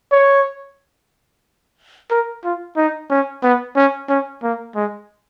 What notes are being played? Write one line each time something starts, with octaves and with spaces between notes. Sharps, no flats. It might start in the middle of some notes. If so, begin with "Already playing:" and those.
C#5
A#4
F4
D#4
C#4
B3
C#4
C#4
A#3
G#3